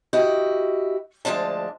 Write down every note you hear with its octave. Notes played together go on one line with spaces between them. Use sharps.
E4 F#4 G4 D#5
D2 F3 G#3 D4 A5